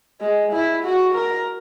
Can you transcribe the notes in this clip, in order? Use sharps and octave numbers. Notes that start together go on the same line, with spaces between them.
G#3
E4
F#4
A#4